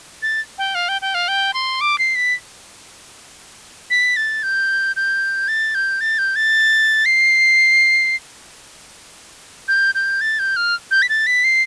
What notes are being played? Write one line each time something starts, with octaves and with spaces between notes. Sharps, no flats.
A6
G5
F5
G5
G5
F5
G5
C6
D6
C7
B6
B6
A6
G6
G6
A6
G6
A6
G6
A6
C7
G6
G6
A6
G6
F6
G6
B6
A6
B6
C7